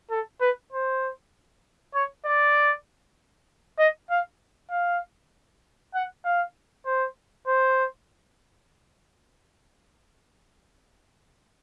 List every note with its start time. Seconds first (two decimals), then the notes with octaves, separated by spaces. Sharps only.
0.11 A4
0.41 B4
0.72 C5
1.95 C#5
2.26 D5
3.79 D#5
4.10 F5
4.71 F5
5.94 F#5
6.25 F5
6.86 C5
7.48 C5